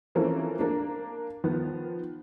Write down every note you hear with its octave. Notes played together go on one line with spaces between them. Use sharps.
E3 F3 A#3 C4 C#4 A4
A#3 D4
D#3 F3 B3